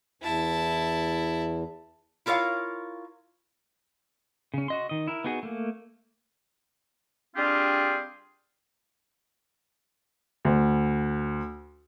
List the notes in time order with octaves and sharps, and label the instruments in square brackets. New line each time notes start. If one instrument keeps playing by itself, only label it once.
[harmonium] E2 [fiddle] E4 A5
[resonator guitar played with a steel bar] E4 F4 A#4 C#5 F5
[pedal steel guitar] C#3 C#4
F#4 D#5 C6
D#3 D#5
E4 A#4
B3 D#4 F#4 G#4
A3 A#3
[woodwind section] G3 C4 D4 F4 G4 G#4
[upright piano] D2